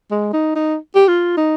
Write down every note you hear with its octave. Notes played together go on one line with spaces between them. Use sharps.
G#3
D#4
D#4
G4
F4
D#4